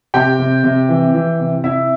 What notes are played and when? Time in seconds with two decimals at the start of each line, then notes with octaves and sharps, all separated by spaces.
0.14 C3 G4 G5
0.39 C3
0.64 C3
0.89 E3
1.14 E3
1.39 C3
1.64 C3 E4 E5